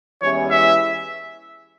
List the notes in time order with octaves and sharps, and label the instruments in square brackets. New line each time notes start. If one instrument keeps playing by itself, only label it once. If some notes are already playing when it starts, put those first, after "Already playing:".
[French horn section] E2 E3 G#3 C#4 G4 [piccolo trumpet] C#5
[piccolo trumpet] E5